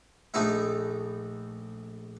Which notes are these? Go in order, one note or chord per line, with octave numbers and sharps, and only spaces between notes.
A#1 A3 D#4 E4 E5